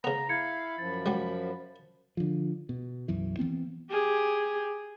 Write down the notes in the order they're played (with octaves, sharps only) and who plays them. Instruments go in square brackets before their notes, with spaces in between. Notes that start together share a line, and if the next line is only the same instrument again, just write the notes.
[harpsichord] C#3 B3 [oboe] A#5 [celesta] F7
[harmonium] E4 F5 [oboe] B5 [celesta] G#6 C#7
[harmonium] F#2 F3 [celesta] A6
[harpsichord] F#3 G3
[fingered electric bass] D3 F3
B2
B1 F#2 E3
E3 F3 B3 C4
[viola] G4 G#4